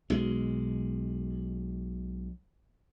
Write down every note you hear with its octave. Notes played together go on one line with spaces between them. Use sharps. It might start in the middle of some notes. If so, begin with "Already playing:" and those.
B1 G#3